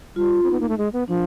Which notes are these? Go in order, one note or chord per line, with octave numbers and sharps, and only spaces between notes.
G3 F4
F4
C4
B3 D#4
A#3
A3
G#3
B3
F3 D4